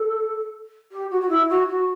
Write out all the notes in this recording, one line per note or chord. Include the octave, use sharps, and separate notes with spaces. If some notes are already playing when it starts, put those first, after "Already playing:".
Already playing: A4
G4
F#4
F#4
E4
F#4
F#4